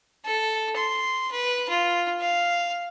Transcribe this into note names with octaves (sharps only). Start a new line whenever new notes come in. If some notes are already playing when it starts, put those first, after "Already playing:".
A4
C6
B4
F4
F5